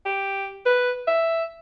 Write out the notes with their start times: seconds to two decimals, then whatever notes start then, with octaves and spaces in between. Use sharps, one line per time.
0.05 G4
0.66 B4
1.07 E5